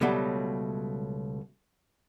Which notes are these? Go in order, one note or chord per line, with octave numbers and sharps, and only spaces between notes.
C#2 B2 F#3 G3 A3